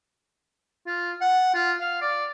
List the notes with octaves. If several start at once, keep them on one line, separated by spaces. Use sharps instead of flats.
F4
F#5
F4
F5
D5